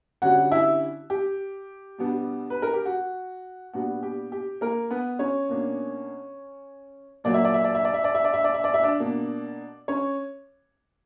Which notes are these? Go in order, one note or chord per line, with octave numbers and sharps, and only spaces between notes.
D3 G3 C#4 F#4 F#5
E4 E5
G4
B2 G3 B3 D4
B4
A#4
G4
F#4
A#2 G3 B3 D4 F#4
G4
G4
A#3 A#4
B3 B4
C#4 C#5
B2 A#3 D4
A#2 F#3 A#3 D5
E5
D5
E5
D5
E5
D5
E5
D5
E5
D5
E5
D5
E5
D5
E5
D4 D5
B2 A#3 D4
C#4 C#5